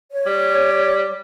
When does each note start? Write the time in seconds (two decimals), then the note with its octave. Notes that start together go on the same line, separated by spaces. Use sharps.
0.12 C#5
0.26 G3